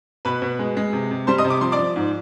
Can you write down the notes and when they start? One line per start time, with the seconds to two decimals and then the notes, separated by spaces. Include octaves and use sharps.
0.25 B2 B4 B5
0.42 B2
0.59 G#3
0.77 G#3
0.93 C3
1.11 C3
1.27 G3 C5 C6
1.38 D#5 D#6
1.44 C3
1.50 D6
1.61 F3 C6
1.72 D5 D6
1.79 F3
1.96 G#2